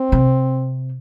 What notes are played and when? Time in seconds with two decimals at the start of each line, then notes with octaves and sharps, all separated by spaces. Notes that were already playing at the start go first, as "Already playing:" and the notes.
Already playing: C4
0.12 C3